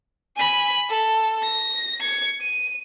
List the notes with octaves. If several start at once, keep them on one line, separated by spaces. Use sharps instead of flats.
G#5 B5
A4
A#6
G#6 C#7
D#7